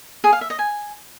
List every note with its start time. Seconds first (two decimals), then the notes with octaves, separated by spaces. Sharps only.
0.24 G#4
0.33 F5
0.41 E5
0.50 D#5
0.59 G#5